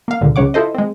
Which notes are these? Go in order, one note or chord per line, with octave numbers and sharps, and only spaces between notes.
A#3 F5
C#2 A#2 D3
C#2 C#3 C#5 F#5 D6
E4 F4 A4 C5 D#5
G#3 C4